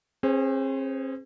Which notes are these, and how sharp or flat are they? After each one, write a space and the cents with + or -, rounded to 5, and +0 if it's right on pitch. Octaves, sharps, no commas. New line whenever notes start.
C4 +45 G#4 +0 C5 -30